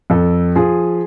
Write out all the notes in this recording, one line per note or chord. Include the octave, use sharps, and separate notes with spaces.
F2 A4
F3 G#4